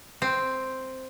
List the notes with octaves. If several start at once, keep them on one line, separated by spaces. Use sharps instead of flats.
C4